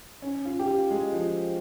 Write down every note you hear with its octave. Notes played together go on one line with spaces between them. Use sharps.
C#4
F4
G4
F4
G#3
F3